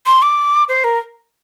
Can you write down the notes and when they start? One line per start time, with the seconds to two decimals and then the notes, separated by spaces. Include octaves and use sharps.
0.06 C6
0.22 D6
0.68 C5
0.84 A#4